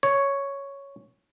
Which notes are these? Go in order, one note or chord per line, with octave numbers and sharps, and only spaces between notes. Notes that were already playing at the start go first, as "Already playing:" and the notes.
C#5